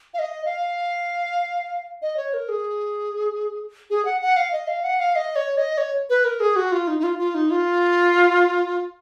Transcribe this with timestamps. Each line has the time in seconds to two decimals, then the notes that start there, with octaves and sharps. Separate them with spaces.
0.14 F5
0.19 D#5
0.45 F5
2.02 D#5
2.17 C#5
2.34 A#4
2.49 G#4
3.90 G#4
4.05 F#5
4.21 F#5
4.36 F5
4.53 D#5
4.68 F5
4.84 F#5
5.00 F5
5.16 D#5
5.36 C#5
5.57 D#5
5.78 C#5
6.10 B4
6.25 A#4
6.40 G#4
6.56 F#4
6.72 F4
6.88 D#4
6.99 D#4
7.03 F4
7.18 F4
7.35 D#4
7.50 F4